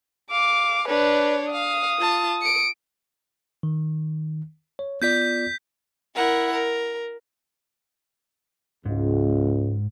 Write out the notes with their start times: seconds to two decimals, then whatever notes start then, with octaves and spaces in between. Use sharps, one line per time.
0.31 F5 D6
0.88 D4 B4 C#5
1.52 F5 D#6
1.98 F4 A5
2.41 C#7 D7
3.63 D#3
4.79 C#5
5.02 B3 F4 D5 G6 B6
6.15 E4 A#4 F#5
6.53 A#4
8.85 C#2 G#2